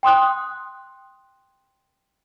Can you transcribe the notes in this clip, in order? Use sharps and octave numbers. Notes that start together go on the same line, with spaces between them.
G5 C6 D#6 F#6